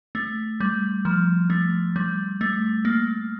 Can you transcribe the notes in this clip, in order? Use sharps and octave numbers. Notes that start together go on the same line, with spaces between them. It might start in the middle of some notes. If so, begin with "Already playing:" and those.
A3
G3
F3
A3
G3
A3
A#3